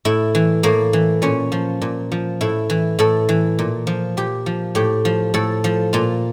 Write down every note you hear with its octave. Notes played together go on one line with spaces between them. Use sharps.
A2 E4
E3
A2 A#3
E3
A#2 C#4
F3
A#2
F3
A2 E4
E3
A2 A4
E3
A#2
F3
A#2 G4
F3
A2 G4
F3
A2 A4
F3
A#2 F4